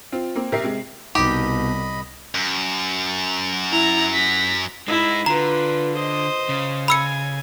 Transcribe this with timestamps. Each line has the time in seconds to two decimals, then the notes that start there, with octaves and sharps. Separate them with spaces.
0.12 C4 F4
0.36 A#3 C4
0.52 A#1 G4 A#4 E5 C7
0.64 C3 G#3
1.15 C2 B2 D#4 G4 D#5 B5
2.35 F#2
3.71 E4 A#5
4.13 A#6 B6
4.88 G#3 D#4 E4
5.26 D3 F4 B4 A#5
5.94 C5 D#5
6.49 C#3
6.88 G#5 B5 E6 C#7